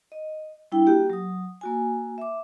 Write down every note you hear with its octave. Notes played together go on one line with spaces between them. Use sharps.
D#5
G3 D4 E4 G5
A#3 F#4 G4 G5
F#3 D#6
A#3 F#4 G#5
E5 D6